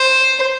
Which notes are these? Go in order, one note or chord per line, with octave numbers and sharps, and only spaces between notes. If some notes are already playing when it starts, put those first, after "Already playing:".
Already playing: C5